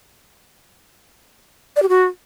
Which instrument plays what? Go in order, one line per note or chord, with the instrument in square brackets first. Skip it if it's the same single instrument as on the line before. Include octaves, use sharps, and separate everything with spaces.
[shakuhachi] D5
G4
F#4